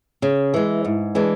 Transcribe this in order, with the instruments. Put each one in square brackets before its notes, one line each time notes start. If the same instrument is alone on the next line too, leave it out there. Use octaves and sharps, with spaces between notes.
[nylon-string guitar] C#3
E3 G#3
G#2
E3 G#3 D4